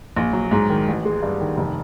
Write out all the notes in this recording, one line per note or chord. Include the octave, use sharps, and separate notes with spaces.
A#1
F#3
G#2
D#3
A1
G#3
G2
D#3
F1